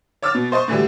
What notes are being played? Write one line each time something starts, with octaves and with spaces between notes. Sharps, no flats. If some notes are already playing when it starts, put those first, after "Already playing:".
C#5 D6 E6 F6 A6
B2
C5 D#5 C6 C#6
A2 D3 E3 F#3 G3